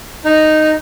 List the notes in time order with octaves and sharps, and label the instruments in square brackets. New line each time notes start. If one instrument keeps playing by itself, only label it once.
[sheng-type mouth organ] D#4